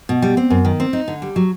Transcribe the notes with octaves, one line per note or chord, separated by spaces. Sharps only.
B2
G3
C4
F#2
D#3
C4
D#4
D3
G3
F#3